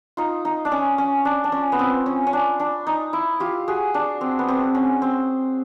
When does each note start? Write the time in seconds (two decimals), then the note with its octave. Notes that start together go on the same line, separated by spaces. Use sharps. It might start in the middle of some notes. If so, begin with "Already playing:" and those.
0.17 D#4 F4
0.45 D#4
0.65 D4
0.72 C#4
0.98 C#4
1.25 D4
1.44 D4
1.52 C#4
1.72 B3
1.79 C4
2.06 C#4
2.27 C#4
2.33 D4
2.60 D4
2.87 D#4
3.13 E4
3.40 F4 G4
3.68 F#4 G#4
3.94 D4
4.21 C4
4.39 B3
4.48 C4
4.75 C#4
5.02 C4